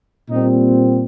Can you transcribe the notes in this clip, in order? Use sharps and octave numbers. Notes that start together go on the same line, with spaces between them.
A#2 G3 C4 D#4